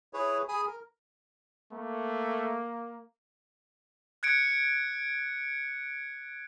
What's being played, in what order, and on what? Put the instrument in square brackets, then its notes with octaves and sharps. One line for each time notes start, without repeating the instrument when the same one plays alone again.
[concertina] E4 G#4 B4 C#5
G#4 G#5 B5 D#6
A#4
[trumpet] A3 [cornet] A#3
[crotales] F#6 G#6 C#7 D7